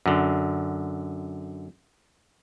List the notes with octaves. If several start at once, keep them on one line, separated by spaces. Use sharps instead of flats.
F#2 D3